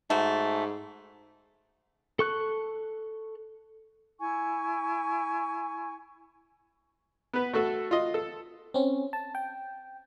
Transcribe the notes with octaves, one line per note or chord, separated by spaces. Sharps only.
G#2 A3 F#4
A4 C#6 F#6
E4 G#5 C#6
B3 B4
A3 F#4 A4
F4 D#5
A4
C4 C#4
A5
G5